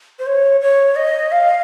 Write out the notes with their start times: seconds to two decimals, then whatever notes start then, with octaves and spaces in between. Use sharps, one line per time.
0.19 C5
0.27 C#5
0.61 C#5
0.96 D#5
1.32 F5